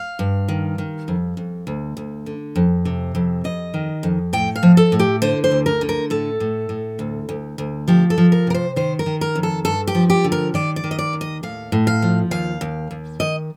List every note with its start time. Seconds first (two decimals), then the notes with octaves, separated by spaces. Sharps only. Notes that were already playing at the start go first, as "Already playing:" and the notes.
Already playing: F5
0.19 G2
0.48 D#3
0.78 D#3
1.08 F2
1.37 F2
1.67 D2
1.97 D2
2.26 D3
2.56 F2
2.85 C3
3.15 F2
3.44 F2 D#5
3.74 D#3
4.03 F2
4.33 A2 G5
4.56 F5
4.63 F3
4.77 A4
4.92 A2
5.00 G4
5.22 D3 C5
5.44 C5
5.51 D2
5.66 A#4
5.81 D3
5.89 A#4
6.10 A2 A4
6.40 A2
6.69 A2
6.99 D2
7.29 D2
7.58 D2
7.88 F3 G4
8.10 A4
8.18 F3
8.32 A#4
8.47 C3 A#4
8.55 C5
8.76 D#3 C5
8.99 A#4
9.06 D#3
9.21 A#4
9.35 F2
9.43 A4
9.65 G2 A4
9.87 G4
9.95 F3
10.10 G4
10.24 D3
10.32 A#4
10.54 D#3 D5
10.76 D5
10.84 D#3
10.91 D#5
10.99 D5
11.13 D#2
11.21 D#5
11.43 A2 F5
11.72 A2
11.87 F5
12.02 F3
12.31 D#2 F5
12.61 D#2
12.91 D#2
13.20 D#3 D#5